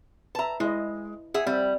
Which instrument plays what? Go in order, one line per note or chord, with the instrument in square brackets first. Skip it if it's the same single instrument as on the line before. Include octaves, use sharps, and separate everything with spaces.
[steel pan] B4 E5 [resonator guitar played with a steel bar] A5 A#5
[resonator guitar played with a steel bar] G#3 [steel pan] E4 D5 D#5
[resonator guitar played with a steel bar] G#4 E5 [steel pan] F#5
[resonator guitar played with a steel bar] G3 [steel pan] C4 E5